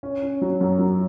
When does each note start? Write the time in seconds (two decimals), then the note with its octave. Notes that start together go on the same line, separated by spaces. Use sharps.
0.03 C#4
0.23 C#4
0.42 F#3
0.61 F#2
0.79 F#3